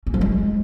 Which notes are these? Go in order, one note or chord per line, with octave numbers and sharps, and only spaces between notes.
C#4
F3
G#3